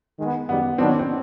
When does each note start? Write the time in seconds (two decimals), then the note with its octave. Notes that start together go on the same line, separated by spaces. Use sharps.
0.18 D#3 G#3 B3
0.48 F#2 D#3 G3 B3
0.78 D#3 F#3 B3 C4 D4
0.89 C#4
0.99 C4